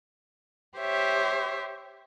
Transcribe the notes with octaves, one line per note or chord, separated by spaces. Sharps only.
G4 C5 C#5 E5